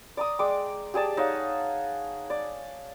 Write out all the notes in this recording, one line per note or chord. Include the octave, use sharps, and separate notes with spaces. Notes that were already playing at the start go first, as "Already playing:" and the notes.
D5 A#5 D#6
G#3 D5 G5 D6
G4 G#4 D5 A5
D#4 C#5 F5 F#5
D5